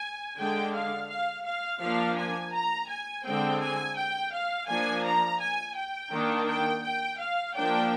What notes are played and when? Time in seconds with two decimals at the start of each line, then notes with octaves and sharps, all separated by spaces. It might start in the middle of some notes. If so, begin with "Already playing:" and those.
Already playing: G#5
0.38 D3 G#3 D4 G5
0.74 F5
1.09 F5
1.45 F5
1.81 F3 A#3 D4 F5
2.17 G#5
2.53 A#5
2.89 G#5
3.24 D3 G#3 C4 G5
3.60 G#5
3.96 G5
4.32 F5
4.68 F3 A#3 D4 G#5
5.04 A#5
5.39 G#5
5.75 G5
6.11 D#3 A#3 D4
6.47 G5
6.83 G5
7.19 F5
7.55 F3 A#3 D4 G5